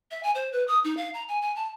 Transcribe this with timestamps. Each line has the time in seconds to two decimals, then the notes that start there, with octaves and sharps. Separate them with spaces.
0.11 E5
0.23 G#5
0.35 C5
0.52 B4
0.68 D#6
0.84 D#4
0.97 F5
1.14 A#5
1.28 G#5
1.42 G#5
1.56 A5